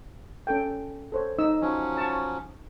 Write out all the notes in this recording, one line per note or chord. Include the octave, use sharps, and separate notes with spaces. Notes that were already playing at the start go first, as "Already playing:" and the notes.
C#4 A4 G5
A4 C5 C#5
D#4 D#5 E6
F3 F#3 C#4
A5 C#6